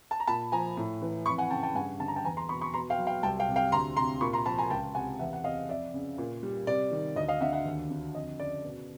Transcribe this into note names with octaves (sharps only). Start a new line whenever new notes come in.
A5
A#5
A#2 A5 B5
F3 G#5 A#5
A2
E3
F2 B5 C#6
F#5 G#5
C#3 G5 A5
G5 A5
G2 F#5 G#5
D3 A5
A#5
G5 A5
E2 G#5 A#5
A#5 C6
B2 B5 C#6
B5 C#6
B2 A#5 C6
F5 G5
F#3
F5 G5
C2 G5 A5
F5 G5
C3
F5 G5
D2 A#5 C6
C3 A#5 C6
A#2 B5 C#6
A#5 C6
F3 A5 B5
G#5 A#5
C#2 G5 A5
C3 F#5 G#5
E2 E5 F#5
F#5
C3 D#5 F5
F2 D5 E5
C#3
A#2
G3
C3 D5
D#3
D2 D#5
D#5 F5
D3 E5 F#5
E5 F#5
D#2
D3
F2 D#5
C#3 D5
B2